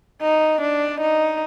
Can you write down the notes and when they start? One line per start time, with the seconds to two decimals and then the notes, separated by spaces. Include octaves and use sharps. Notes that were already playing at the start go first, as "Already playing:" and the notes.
0.23 D#4
0.61 D4
1.01 D#4